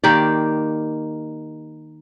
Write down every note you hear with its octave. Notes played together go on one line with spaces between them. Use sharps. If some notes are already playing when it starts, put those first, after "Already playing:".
D#3 A#3 G4 D5